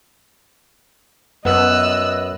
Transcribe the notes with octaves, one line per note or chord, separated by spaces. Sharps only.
F#2 B3 D#5 E6 F#6